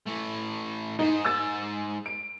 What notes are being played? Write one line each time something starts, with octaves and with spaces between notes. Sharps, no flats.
E3 A3
G#2 D#4 C5
E6 A6
D7